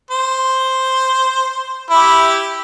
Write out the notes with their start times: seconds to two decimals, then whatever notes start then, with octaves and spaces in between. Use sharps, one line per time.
0.11 C5
1.90 E4 G4